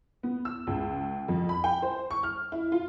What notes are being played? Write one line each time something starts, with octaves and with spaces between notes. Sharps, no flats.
B3
E6
C#2
F2
B5
G5
C5
C#6
F6
E4
F4